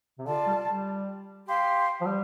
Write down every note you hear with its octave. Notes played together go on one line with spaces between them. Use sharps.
C3
D3 F4 D5 A5
G3
G3
G4 F5 C6
F3
G3